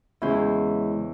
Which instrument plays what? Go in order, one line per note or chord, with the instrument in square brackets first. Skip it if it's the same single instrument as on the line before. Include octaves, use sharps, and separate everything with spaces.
[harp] E2 C#4 C5 [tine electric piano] C#3 G#3 E4